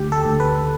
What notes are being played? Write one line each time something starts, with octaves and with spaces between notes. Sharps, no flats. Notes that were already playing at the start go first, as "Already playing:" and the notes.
Already playing: D2 G4
A4
D2
B4